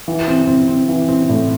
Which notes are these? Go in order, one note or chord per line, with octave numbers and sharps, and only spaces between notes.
E3
C4
C4
C4
E3
C4
A2